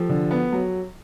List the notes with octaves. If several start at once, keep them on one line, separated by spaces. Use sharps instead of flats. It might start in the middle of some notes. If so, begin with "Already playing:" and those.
Already playing: F3 G4 A4
D3
B3
F#3